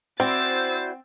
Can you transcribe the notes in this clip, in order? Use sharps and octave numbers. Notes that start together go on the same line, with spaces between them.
C4 E4 F#4 C5 D5 E6 G6 A6